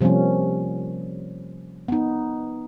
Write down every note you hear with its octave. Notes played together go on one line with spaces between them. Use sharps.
C3 F3 G3 A#3 C#4
B3 D#4